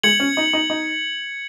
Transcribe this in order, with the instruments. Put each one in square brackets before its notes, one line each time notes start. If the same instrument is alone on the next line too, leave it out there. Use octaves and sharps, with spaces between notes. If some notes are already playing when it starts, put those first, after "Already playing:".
[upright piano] G#3 [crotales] G#6 C#7 F#7
[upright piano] C#4
D#4
D#4
D#4